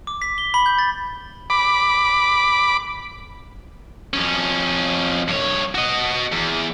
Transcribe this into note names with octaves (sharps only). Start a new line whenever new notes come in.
D6
B6
G7
B5
G6
A6
B5 D6
F2 C#4
G2 C#5
F#4 D#5
E2